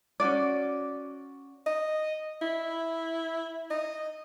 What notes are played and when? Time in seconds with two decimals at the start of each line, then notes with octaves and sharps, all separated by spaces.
0.20 C#4 D4 F#4 D5
1.66 D#5
2.42 E4
3.71 D#5